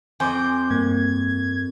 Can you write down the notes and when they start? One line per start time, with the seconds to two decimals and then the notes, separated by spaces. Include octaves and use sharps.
0.20 F2 G#5 C6 D6 G6
0.70 G2 A#3 G#6